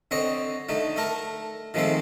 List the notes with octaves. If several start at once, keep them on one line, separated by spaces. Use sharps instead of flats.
D3 C4 C#5 D#5
D3 A3 D#4
A3 A4 A#4 A5
D#3 F3 G#3 A3 C4 A4